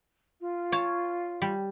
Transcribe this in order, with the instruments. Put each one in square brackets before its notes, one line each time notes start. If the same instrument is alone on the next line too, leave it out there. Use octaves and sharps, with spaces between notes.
[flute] F4
[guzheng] C#5 A5
G3